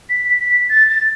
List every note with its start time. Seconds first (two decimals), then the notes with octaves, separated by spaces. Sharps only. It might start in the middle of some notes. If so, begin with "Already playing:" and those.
0.10 B6
0.40 B6
0.69 A6
0.89 A6